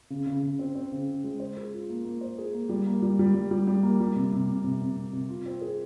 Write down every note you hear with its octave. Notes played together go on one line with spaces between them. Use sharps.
C#3
C#3
C#3
C4
C4
C#3
C#3
G#3
C5
G#4
F4
A#3
A#3
C5
G#4
A#3
G3
A#3
G3
G3
G3
G3
G3
A#3
G3
C3
C3
C3
C3
C3
C3
C3
F4
C4
G#4